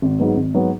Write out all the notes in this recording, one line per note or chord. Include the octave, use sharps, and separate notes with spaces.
G#1
G#2 F#3 B3
G#1
G#2 F#3 B3